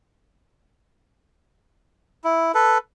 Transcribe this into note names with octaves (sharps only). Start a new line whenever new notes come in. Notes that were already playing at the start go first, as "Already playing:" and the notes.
E4
A4 B4